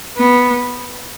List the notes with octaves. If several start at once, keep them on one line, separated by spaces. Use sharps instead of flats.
B3